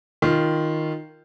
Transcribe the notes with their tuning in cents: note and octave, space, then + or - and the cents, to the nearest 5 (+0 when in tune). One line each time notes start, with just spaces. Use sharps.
D#3 +0 F4 -10